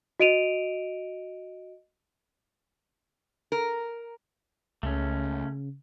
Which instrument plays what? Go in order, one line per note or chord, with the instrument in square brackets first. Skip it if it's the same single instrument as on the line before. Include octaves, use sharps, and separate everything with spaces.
[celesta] F#4 D#5 D7 D#7 F7
[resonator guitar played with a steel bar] A#4
[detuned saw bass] C#2 [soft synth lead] C#3 [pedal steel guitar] A3 C#4